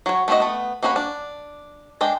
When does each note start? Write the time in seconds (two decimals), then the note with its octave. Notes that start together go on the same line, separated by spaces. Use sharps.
0.06 F#3 C#5
0.28 A3 C4 C#4 F#4 D#5
0.40 A3 B3
0.83 A#3 C#4 F#4 G#4 B4
0.96 D4
2.01 G#3 D4 G#4 G5